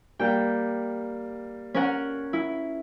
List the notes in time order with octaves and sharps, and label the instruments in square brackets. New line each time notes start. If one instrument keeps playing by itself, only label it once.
[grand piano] G3 A#3 G4 [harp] G5
[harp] C#4 A#4 F#5
E4